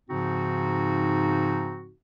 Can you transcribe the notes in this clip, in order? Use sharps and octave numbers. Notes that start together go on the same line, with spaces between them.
G#2 C#3 F3 C4 D#4 F#4